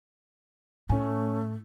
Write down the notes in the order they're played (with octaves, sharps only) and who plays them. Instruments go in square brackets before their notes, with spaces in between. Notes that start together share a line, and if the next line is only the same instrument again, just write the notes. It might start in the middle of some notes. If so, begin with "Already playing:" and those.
[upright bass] A2 [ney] A3 [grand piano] C#4 G#5